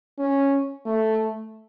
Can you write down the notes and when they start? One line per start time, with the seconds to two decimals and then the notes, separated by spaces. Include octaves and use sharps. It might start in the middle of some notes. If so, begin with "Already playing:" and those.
0.19 C#4
0.86 A3